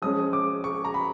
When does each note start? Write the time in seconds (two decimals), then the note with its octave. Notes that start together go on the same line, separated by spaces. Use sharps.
0.02 F3 G#3 C#4 D#6
0.33 D6
0.64 C#6
0.84 A#5
0.94 B5